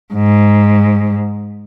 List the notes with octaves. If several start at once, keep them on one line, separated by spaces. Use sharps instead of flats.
G#2